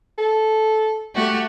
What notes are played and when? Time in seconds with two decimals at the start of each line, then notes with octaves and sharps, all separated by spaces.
0.18 A4
1.13 A3 F#4 G4